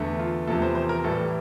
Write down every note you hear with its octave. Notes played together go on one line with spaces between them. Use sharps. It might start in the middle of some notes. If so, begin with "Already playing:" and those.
Already playing: E2 D3 A3
F4
E2 C3 F3 A3 A4
C5
C5
A#4
A2 E3 G3 A4